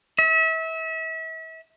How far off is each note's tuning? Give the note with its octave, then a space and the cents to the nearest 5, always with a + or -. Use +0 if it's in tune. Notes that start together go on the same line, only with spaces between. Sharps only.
E5 -35